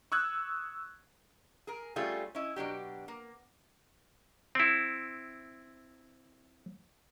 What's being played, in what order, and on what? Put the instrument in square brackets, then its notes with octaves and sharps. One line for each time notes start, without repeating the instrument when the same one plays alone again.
[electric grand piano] C#6 D#6 E6 F#6 G#6
[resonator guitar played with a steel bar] G#4 A#4
G3 A3 C#4 F4 G#4
C#4 E4 D#5
B2 F#3 D4 G4
A#3
[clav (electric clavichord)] C4 E4